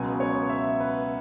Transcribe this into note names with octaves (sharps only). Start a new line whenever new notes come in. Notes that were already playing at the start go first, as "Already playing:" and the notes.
Already playing: C#2 B2 F#3 B3 G#5
C#5
E5
B4